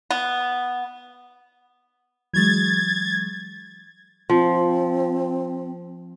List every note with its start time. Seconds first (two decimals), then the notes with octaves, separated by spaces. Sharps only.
0.10 B3
2.34 E3 F#3 G#3 G#6 A6
4.30 F3 C4